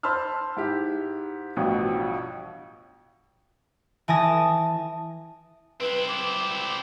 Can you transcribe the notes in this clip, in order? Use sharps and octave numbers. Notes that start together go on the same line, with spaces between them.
C5 A5 B5 C6 E6 F6
G#2 E4 G4
A1 G2 B2 F3
E3 G#5 A5 D#6 A#6
C4 E4 B4
D6